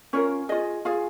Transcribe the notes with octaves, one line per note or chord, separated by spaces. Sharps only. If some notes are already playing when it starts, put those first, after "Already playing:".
C#4 F4 A#4 C#5
F4 G#4 D#5
F4 G#4 F5